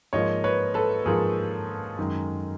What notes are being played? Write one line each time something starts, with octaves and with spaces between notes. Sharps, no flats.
G#2 F3 A#3 C#5 D#5
B4 C#5
A4 B4
G#2 F3 A#3 G#4 A#4
F#2 D#3 G#3